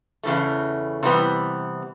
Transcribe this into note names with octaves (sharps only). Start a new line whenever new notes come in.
E2 C#3 E3 A3
C3 E3 G3 B3